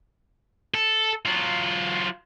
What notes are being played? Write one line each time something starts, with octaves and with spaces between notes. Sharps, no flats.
A4
F#3 F4